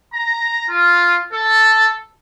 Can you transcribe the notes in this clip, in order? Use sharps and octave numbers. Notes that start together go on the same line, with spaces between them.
A#5
F4
A4